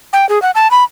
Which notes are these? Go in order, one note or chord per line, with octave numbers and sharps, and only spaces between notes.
G5
G#4
F#5
A5
B5